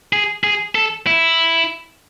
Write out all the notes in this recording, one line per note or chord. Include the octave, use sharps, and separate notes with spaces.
G#4
G#4
A4
E4